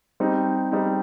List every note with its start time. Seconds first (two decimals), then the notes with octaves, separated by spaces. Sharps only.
0.20 G3 C4 D#4
0.72 G3 C4 D#4